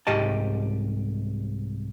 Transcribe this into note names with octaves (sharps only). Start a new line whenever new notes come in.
C2 G#2 G4 D#5 A5